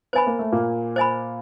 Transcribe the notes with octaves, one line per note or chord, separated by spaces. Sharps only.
B3 C5 D#5 G#5 B5
A#3
A3
A#2 A#3
C5 D#5 G#5 B5